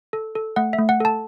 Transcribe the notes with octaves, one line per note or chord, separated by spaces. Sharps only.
A4
A4
A3 F#5
E5
A3
F#5
A4 A5